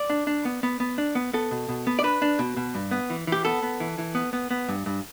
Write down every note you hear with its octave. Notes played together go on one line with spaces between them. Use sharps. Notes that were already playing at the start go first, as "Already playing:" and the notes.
Already playing: D5
D4
D4
B3
B3
B3
D4
B3
B3 A4
B2
B2
B3
D5
D4 B4
D4
B2
B2
G2
B3
E3
E3 G4
B3 A4
B3
E3
E3
B3
B3
B3
G2
G2